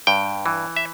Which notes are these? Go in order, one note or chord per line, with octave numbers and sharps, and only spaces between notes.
G2 G5
E3
E5